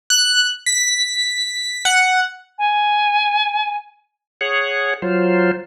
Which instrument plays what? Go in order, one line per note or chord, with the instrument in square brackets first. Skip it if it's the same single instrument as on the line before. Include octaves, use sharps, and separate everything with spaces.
[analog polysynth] F#6
B6
F#5
[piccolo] G#5
[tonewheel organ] G#4 C#5 F#5
F#3 F4 C5